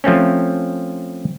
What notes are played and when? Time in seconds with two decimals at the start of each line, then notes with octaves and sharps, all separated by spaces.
0.04 F3 A3 C4 C#4